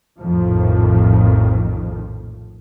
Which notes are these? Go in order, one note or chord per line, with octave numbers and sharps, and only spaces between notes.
A#1 F2 A2 D#3 F3